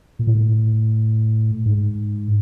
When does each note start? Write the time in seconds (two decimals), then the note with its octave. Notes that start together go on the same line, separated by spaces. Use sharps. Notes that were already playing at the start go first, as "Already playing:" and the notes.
0.19 A#2
0.27 A2
1.66 G#2